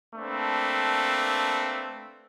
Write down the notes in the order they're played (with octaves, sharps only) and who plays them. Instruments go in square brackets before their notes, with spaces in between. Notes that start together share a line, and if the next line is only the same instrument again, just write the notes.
[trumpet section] A3 A#3 C4 D4 B4